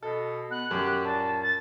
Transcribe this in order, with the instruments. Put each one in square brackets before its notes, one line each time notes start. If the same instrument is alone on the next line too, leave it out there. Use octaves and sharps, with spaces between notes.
[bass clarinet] B2 [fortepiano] A4
[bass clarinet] B3 [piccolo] F#6
[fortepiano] F#2 [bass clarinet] G4
[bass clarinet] A#2 [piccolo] A5
[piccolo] A6